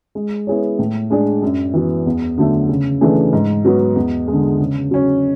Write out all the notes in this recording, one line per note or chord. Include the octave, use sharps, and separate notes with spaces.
G#3
B3 E4 G#4 C#5
A2
G#3 D4 G#4 D5
F#2
E3 B3 F#4
E2
D3 F#3 A3
C#3
E3 A3 D4 G#4
G#2
F#3 B3 F#4
E2
D3 G#3
C#3
F#3 C#4